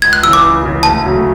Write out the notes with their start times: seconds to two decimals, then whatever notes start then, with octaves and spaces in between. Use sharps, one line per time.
0.02 C#2 G#6
0.13 F#6
0.23 E3 E6
0.27 C#3
0.33 D6
0.43 C#2
0.63 C#3 E3
0.83 D2 A5
1.04 C#3 F#3 A3